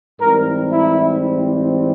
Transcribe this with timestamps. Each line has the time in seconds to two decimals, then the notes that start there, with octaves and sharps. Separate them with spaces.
0.20 G#2 E3 G3 C4 A#4
0.72 E4